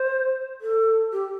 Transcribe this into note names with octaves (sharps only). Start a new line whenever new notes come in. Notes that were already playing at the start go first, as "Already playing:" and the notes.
Already playing: C5
A4
G4